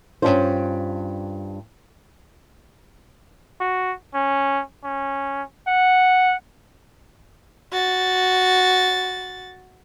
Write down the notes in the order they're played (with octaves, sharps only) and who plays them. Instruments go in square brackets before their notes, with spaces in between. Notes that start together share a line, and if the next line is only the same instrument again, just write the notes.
[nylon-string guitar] G2 B2 C#4 D4 F4 C5
[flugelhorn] F#4
C#4
C#4
F#5
[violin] F#4 A6